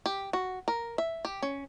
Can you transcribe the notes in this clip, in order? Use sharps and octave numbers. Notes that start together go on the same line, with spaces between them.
G4
F#4
A#4
E5
G4
C#4